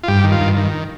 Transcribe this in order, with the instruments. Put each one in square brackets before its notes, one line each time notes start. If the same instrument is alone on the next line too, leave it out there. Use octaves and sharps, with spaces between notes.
[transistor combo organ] F4
G2 G4
D#3
F4
G2
D#3